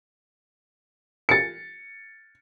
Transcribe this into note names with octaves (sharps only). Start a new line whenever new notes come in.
A6 C#7